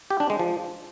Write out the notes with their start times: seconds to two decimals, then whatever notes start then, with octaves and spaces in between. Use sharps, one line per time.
0.10 G4
0.20 D4
0.30 G#3
0.39 F3